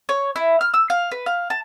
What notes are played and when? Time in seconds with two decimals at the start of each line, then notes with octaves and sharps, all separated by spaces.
0.09 C#5
0.36 E4
0.61 F6
0.74 E6
0.90 F5
1.11 B4
1.26 F5
1.50 A5